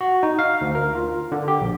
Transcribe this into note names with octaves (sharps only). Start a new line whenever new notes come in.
F#4
D#4
F5
D2
A#4
F4
D3
G4
A#1